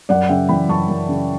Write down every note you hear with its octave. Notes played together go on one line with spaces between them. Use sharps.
F#2 D5 F#5
C#3 E5 G5
E3 G5 B5
F#2 A5 C#6
F#2
C#3